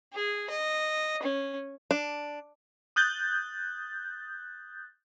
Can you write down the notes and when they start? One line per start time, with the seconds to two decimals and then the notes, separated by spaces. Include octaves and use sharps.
0.14 G#4
0.50 D#5
1.22 C#4
1.91 D4
2.96 D#6 F#6 G6 A6